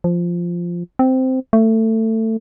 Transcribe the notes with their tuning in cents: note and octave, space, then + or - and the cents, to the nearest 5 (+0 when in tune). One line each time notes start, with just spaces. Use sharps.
F3 -5
C4 -10
A3 +20